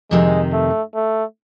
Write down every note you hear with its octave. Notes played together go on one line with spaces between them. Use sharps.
F2 C3 D#3 G#3
A3
A3